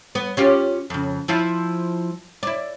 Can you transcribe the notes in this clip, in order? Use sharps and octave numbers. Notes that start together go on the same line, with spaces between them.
B3
C#4 F4 G4
F2 C#3
F3 E4 F4
E4 D5